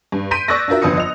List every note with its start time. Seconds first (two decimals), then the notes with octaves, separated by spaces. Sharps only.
0.12 G2
0.31 C6 G6 B6 D7 D#7
0.48 D5 C#6 E6 F#6 A6 A#6
0.68 D4 F4 F#4 A#4 E5
0.82 G1 F2 D4 B4 D#6 C#7
0.97 D#5 F7